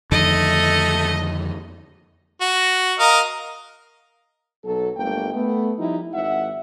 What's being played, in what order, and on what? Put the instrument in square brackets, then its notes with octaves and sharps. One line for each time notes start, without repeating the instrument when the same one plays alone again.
[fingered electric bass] F2 D3 D#3 [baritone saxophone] A3 [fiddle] D#5
[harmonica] F#4
A#4 D#5 F5
[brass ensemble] B1 F#3 A4
G1 D3 A3 A#3 G5
A3 B3
F3 G3 D#4 E4
G#1 G#2 E5 F#5